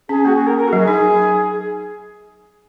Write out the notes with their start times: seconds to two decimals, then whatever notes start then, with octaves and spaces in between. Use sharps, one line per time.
0.09 C#4 G#4
0.24 A#3 F#4
0.35 G#4
0.46 A#4
0.57 A#4
0.67 F#4
0.73 F#3
0.78 G#4
0.88 D#4